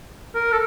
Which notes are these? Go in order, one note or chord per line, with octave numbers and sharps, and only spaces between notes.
A#4
A4